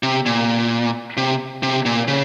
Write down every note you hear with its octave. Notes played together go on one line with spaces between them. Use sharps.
C3
A#2
C3
C3
A#2
C#3